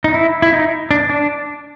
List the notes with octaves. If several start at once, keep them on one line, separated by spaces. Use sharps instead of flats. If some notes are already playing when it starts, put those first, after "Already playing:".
D#4
E4
E4
D#4
D4
D4